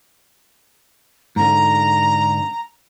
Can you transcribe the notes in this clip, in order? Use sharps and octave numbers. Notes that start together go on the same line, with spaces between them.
G#2 D3 A#5